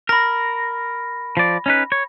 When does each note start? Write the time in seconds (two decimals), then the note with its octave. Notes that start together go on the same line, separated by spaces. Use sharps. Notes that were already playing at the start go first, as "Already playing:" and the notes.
0.09 A#4 B5 A#6
1.37 F3 D5
1.66 C#4 D#4 B4
1.92 C#5